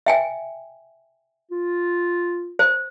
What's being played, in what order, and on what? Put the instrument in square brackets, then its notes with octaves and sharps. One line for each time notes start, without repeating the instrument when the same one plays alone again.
[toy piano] E5 G5 G#5
[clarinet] F4
[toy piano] C5